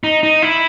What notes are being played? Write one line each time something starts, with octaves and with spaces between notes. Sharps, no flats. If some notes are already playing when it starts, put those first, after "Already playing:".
D#4
D#4
E4